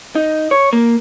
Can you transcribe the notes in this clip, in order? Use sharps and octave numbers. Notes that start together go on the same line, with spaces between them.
D#4
C#5
A#3